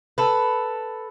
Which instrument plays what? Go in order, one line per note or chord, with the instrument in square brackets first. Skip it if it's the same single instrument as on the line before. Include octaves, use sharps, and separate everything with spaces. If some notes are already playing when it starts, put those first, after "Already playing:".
[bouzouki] A4 B4